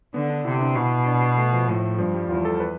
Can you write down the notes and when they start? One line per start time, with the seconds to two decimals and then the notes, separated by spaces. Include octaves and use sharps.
0.14 D3 B3
0.30 D4
0.45 C3 E4
0.61 D4
0.76 B2 E4
1.06 D4
1.22 B3
1.37 A3
1.53 F3
1.68 A2 F3
1.98 G2 F3
2.14 G3
2.29 E2 F4
2.45 A4
2.60 B4